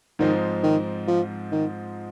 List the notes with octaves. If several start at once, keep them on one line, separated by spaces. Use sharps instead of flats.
G#2 D#3 F3 C4 D#4
D#3
F3
D#3